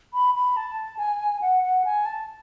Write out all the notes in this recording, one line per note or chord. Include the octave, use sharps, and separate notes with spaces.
B5
B5
A5
G#5
F#5
F#5
G#5
A5